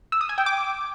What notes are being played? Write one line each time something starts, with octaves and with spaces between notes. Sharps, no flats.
E6
D#6
G#5
G5
D6